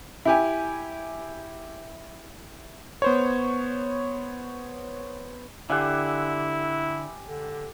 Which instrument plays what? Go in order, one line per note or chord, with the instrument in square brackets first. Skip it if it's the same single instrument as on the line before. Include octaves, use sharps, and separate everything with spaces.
[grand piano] E4 G4 G#5
[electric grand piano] B3 C5 C#5
[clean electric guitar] D3 [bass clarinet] E4 [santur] G4 F#5 G#5
[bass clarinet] D3